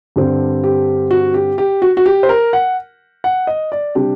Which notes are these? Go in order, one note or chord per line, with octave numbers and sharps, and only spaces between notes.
G2 D3 G3 C4
G4
F#4
G4
G4
F#4
F#4
G4
C5
A#4
F#5
F#5
D#5
D5
C3 G3 D4 G4